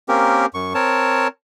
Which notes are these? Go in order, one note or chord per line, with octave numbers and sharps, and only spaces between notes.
A#3 C4 C#4 G4 A#4
F#2 C#6
C4 A#4 C#5 A5